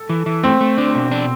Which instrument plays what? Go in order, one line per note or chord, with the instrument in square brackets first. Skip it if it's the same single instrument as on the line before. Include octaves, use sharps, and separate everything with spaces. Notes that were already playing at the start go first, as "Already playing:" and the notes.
Already playing: [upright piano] A4
[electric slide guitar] E3
E3
[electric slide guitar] A3 [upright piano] C4
[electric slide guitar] A3
D4
B2
D4